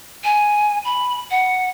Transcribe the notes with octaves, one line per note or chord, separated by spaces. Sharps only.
G#5
B5
F#5